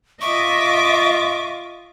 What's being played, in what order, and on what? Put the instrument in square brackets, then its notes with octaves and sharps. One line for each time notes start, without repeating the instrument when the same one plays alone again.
[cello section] F4 D#5 [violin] E5 D6 [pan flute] C#6